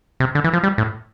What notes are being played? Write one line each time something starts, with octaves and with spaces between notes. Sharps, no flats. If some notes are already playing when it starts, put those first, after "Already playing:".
C3
D3
E3
F3
G3
A2